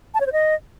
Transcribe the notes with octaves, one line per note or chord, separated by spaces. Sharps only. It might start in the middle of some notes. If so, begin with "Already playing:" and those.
A5
C#5
C5
D#5